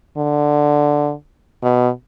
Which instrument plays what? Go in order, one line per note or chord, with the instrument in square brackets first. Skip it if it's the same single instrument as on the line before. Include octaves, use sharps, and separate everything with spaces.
[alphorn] D3
B2